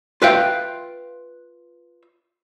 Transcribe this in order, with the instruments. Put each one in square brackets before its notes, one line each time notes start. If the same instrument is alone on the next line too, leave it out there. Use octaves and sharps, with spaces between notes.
[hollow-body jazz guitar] F4 B4 E5 F5 G5